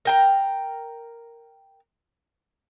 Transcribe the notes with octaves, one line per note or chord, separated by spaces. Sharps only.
A#4 G5 A#5